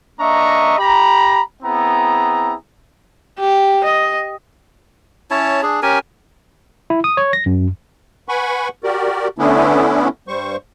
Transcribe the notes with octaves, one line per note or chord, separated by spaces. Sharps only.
A#3 D4 D#5 E5 A#5 C#6
G4 A#5 B5
B3 C4 E4 G#4 A#5
G4
D#5
C#4 E4 C#5 A5
D4 G#4
C#4 G4 A#4 G#5
E4
D#6
C#5
A#6
F#2
B4 F#5 G#5 B5 C#6
F#4 G4 A#4 D5
D3 A3 B3 C#4 D4 E4
G2 G3 C5 C#6